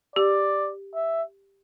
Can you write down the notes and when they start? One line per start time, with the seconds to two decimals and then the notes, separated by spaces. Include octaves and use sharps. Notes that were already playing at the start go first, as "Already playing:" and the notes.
0.16 G4 D5
0.95 E5